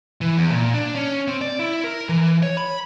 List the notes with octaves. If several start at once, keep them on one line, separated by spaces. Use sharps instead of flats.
E3
E2
A#2
D4
C#4
C4
D5
E4
A#4
E3
C#5
B5